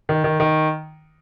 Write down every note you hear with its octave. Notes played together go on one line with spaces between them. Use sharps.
D#3
D#3
D#3